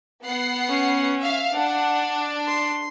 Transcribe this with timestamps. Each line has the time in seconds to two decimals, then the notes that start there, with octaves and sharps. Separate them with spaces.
0.24 B3 F#5 C7
0.69 C#4
1.21 E5 F5
1.54 D4 F#5
2.48 C6